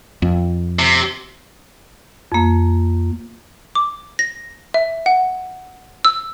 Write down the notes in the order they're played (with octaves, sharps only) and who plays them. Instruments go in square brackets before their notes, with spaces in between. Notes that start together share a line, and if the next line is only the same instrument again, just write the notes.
[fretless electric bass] F2
[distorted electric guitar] C3
[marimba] F2 A#3
[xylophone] D6
A#6
E5
F#5
E6